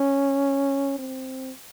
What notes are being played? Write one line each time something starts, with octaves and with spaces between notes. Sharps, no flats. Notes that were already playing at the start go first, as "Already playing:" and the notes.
Already playing: C#4
C4